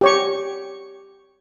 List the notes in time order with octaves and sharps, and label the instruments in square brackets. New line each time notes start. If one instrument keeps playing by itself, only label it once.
[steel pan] G4 C#5 C#6